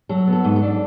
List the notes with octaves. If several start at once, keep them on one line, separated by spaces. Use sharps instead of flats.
F#3 A4
B3
A4
G#2
A4
D4